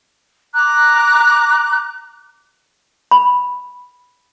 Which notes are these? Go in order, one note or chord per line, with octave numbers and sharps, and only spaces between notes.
A#5 D6 F#6
B5